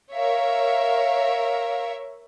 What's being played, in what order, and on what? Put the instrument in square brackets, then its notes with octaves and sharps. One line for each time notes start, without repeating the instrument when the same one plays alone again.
[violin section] A#4 C#5 E5 [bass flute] F5